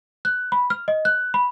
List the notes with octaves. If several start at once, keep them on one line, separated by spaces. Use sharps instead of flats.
F#6
B5
F6
D#5
F#6
B5